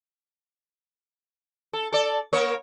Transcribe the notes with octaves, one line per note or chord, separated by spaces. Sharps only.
A4
A4 D5
A#3 A#4 C#5